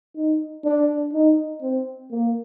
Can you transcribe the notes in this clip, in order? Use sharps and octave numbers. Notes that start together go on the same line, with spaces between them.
D#4
D4
D#4
C4
A#3